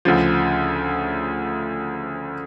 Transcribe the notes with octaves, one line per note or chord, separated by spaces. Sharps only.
D2 C#3 F3